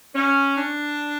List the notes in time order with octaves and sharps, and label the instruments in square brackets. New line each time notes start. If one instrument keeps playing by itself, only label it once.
[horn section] C#4
D4